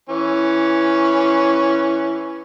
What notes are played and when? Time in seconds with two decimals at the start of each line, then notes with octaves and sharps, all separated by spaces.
0.09 E3 C#4